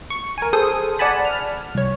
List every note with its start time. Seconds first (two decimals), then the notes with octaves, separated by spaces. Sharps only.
0.10 C#6
0.38 A#4 G#5
0.53 G#4 A4 C5 D#6
0.99 D5 F#5 G#5 A5 B5
1.25 F6
1.74 C2 C#5